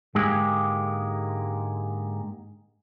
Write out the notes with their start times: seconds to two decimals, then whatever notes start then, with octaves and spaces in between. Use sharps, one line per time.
0.15 G#2 D3 G#3 A#3 G4 G#4